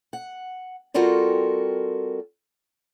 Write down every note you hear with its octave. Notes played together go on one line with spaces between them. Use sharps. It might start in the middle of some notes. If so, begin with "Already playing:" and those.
F#5
G3 C4 F4 F#4 A4 A#4